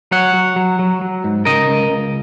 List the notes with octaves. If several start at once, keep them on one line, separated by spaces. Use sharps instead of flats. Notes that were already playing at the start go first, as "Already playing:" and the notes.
F#3 C#5 F#5
F#3
F#3
F#3
F#3
G#2
C#3 A#4 D#5
C#2
C#2